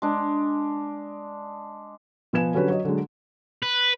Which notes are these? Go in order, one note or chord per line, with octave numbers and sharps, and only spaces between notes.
G#3 D4
B2 F3 B4 G#5 G#6 E7
D3 F#3 C#4 F#4 G4 B4
F#3 C#5 D#5
D3 F#3 G#3
B4